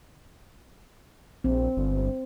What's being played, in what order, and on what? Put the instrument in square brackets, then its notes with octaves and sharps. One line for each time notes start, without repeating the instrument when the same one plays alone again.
[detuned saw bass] A#1 [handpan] C4
[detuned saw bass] G1